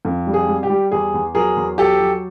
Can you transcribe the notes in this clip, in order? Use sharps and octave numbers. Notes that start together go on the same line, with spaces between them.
F2
G3
G#4
G3
G4
G3
E2 G#4
E2
F#3 G#4 A#4
E2
F#3 G4 A4
F#3